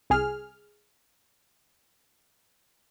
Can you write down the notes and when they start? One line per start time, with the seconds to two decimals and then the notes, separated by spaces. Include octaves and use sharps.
0.10 C2 G#4 F6